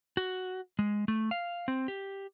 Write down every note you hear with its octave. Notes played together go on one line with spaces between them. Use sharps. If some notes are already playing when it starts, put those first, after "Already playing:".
F#4
G#3
A3
F5
C4
G4